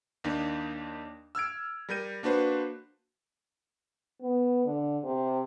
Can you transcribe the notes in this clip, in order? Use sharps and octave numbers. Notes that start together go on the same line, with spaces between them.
D#2 A#3 D4 D#4
E6 F6 G#6 D7
G3 A#4 G6 D#7
A#3 D4 F#4 B4 C5
B3
D3
C3